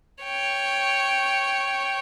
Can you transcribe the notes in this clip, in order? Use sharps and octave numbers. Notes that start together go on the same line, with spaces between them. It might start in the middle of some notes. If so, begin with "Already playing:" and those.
C#5 G5